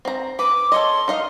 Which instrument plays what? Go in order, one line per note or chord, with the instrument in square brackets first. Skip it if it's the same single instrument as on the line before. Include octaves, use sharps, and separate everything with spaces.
[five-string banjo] C4 A#5
[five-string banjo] B4 [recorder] D6
[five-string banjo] A4 C#5 D#5 [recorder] C6
[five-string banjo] D#4 D#5 F5